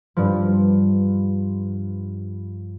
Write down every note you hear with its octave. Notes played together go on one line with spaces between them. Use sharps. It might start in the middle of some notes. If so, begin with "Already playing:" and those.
G2 F3